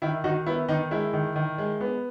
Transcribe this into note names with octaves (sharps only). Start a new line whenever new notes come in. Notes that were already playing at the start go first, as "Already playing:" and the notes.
D#3 E4
D#3 D#4 F#4
B3 E4
D#3 D#4
G#3 E4
D#3
D#3
G#3
B3